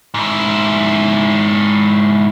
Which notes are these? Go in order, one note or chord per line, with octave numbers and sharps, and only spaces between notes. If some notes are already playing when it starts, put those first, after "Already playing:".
G#2 E4